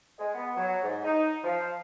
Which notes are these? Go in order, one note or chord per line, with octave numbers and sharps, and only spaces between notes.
G#3
B3
F#3
G#2
D#4
F3